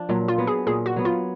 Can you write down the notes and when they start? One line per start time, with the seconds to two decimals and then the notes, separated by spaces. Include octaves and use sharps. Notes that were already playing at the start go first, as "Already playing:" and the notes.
Already playing: F3 D4
0.09 A#2 F#3
0.28 F4
0.38 F#3 B3
0.47 G#4
0.67 A#2 G#4
0.86 F#4
0.96 F#3 B3
1.05 F4